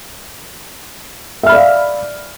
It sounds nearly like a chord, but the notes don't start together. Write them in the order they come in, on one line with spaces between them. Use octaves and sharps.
E5 F6 B5 D5 F5